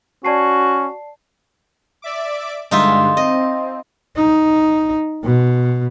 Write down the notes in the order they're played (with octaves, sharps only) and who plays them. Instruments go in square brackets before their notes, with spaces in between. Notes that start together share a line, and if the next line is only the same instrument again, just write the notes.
[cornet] C#4 [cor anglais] F#4 [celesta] D5 A5 C7
[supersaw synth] D5 E5 D6
[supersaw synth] G2 D3 G#3 [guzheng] D#4 F4 E5
[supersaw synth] C4 [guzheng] D#5
[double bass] D#4
B2